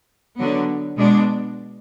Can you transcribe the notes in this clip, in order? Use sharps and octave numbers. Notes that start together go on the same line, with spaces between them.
D3 F#3 B3
B2 G#3 D4